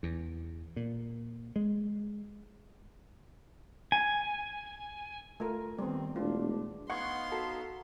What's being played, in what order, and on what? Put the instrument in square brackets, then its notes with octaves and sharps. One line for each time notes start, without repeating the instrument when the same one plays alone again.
[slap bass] E2
A#2
G#3
[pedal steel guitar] G#5
[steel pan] A3 F4 A#4
[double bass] D#3 C4 [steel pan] G3 B3
[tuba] E1 [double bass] A3 D4 [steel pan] F4
[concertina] B3 D#4 F5 [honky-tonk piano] F#5 C#6 G#6 [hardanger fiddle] C6
[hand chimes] F#4 A#5 C7 [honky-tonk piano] A4